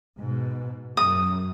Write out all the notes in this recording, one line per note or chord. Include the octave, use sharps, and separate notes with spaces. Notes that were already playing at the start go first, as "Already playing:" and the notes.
G#2 B2
F#2 D#6